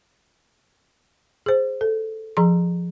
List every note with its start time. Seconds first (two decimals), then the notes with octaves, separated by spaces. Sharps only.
1.46 G#4 C5
1.81 A4
2.37 F3 G#4 A#5 C6